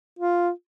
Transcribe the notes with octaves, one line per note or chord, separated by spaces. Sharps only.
F4